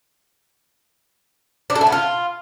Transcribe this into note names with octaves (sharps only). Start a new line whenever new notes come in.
D4
A4
E4
B3
F4